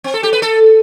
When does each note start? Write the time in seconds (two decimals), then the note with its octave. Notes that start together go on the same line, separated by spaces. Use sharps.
0.04 C4
0.14 A4
0.23 G4
0.33 B4
0.42 A4